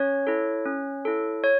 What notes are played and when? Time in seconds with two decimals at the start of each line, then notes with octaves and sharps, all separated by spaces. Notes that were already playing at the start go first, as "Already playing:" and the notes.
Already playing: C#4 C#5
0.27 E4 A4
0.66 C#4
1.05 E4 A4
1.44 C#5